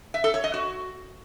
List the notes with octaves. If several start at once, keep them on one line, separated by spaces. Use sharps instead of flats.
E5
A4
C#5
D#5
F#4